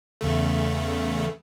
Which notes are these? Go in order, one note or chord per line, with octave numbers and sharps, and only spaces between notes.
E2 C#3 A3